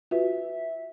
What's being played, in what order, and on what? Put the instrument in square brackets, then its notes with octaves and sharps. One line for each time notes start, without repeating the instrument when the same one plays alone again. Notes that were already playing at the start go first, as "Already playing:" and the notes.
[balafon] F4 F#4 B4 [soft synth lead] E5